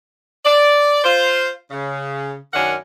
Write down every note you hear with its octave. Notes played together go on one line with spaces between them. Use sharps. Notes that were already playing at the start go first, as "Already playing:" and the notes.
D5
F4 C5
C#3
F#2 D#3 C#4 D4 A#4 F#5